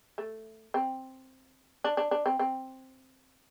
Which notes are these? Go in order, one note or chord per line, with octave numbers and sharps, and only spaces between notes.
A3
C4
D4
D4
D4
C4
C4